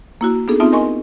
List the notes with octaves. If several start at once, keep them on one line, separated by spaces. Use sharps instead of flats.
A#3 E4 F#4
B3 D4 D#4 G#4 A4
B3 C4 D#4 F4 E5 A5
A#4 D#5 G#5 C6 C#6